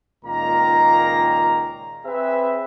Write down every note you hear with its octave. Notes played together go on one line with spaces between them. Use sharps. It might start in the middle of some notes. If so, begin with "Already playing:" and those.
C#2 A#2 D#3 A#3 A#5
C4 G#4 B4 E5